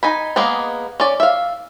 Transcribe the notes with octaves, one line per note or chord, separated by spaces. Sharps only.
D#4 G#5 B5
G#3 A#3 B3 G#4
C#4 D5
E5 F5